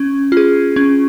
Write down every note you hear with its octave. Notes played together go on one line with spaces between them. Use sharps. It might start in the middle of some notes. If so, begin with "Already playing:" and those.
Already playing: C#4
F4 G#4
C#4